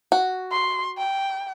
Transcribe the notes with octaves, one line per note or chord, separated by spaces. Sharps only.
F#4
C6
G5